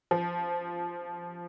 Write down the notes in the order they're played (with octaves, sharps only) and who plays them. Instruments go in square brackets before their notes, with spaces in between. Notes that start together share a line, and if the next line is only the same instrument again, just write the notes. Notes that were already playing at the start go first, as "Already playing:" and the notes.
[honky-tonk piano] F3